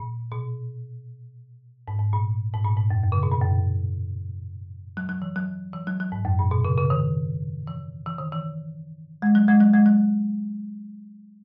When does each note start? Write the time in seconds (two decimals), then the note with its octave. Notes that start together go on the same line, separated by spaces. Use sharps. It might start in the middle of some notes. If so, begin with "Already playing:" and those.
Already playing: A#2
0.32 B2
1.88 G#2
1.99 G#2
2.13 A#2
2.54 G#2
2.64 A#2
2.77 G#2
2.91 F#2
3.03 F#2
3.12 C#3
3.23 B2
3.31 A#2
3.41 F#2
4.97 F#3
5.09 F#3
5.22 E3
5.36 F#3
5.73 E3
5.87 F#3
6.00 F#3
6.12 G#2
6.25 F#2
6.39 A#2
6.51 B2
6.65 C#3
6.78 C#3
6.90 D#3
7.67 E3
8.06 E3
8.18 D#3
8.32 E3
9.22 G#3
9.35 F#3
9.48 G#3
9.61 F#3
9.74 G#3
9.86 F#3